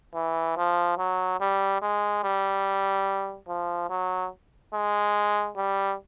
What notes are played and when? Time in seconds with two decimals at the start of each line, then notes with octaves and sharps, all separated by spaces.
0.15 E3
0.57 F3
0.98 F#3
1.41 G3
1.82 G#3
2.24 G3
3.48 F3
3.90 F#3
4.74 G#3
5.57 G3